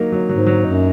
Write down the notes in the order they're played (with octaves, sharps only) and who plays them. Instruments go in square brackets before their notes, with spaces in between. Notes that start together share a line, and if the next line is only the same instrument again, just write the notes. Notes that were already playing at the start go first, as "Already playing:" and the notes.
Already playing: [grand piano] F#3 A#3 D#4
F#3
[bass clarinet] G#2 [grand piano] F#3
[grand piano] F#3
[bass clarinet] F#2 [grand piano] D#4